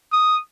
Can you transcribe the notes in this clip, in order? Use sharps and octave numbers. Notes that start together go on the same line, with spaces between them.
D#6